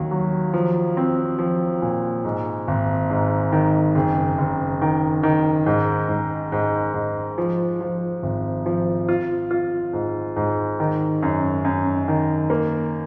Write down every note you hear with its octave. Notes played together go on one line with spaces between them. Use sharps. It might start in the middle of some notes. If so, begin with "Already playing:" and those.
Already playing: D#2 F#3
F#3
F3
C4
F3
A#2
G#2
G#1
G#2
D#3
F#1
F#1
D#3
D#3
G#2
G#2
G#2
G#2
F3
F3
G#1
F3
F4
F4
G#2
G#2
D#3
F#2
F#2
D#3
A#3